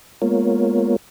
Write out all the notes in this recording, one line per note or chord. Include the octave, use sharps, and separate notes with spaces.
G#3 A#3 B3 F4 A#4 C#5